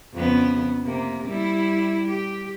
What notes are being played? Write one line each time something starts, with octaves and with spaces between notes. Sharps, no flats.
F2 C#3 B3
C3 A#3
G3 E4
G4